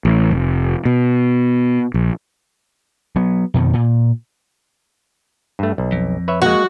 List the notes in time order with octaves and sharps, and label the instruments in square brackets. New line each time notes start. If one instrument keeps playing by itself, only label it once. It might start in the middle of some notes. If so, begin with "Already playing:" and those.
[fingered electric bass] A1
F1
B2
A#1
[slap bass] F#3 B3
F2 B2 D#3
A#2
[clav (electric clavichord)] G2 A3
B1
[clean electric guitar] F2
[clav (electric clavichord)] B4 C#5 E5
[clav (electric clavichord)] G#3 A#3 [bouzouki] F#4